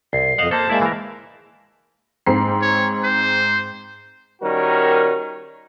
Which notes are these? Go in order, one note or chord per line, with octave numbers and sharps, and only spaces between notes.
C2 C7
F2 C5 D#5 F5 F#5
A#3 A4 C5 A5
G#3 A#3 E4 D5 E5
E3 A#4
G#2 C4 C7
C#5
C5
D#3 G3 C#4 F#4 A#4